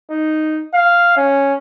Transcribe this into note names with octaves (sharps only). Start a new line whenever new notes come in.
D#4
F5
C#4